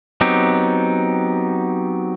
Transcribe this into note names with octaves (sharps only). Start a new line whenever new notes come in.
F#3 B3 C4 D#4 G4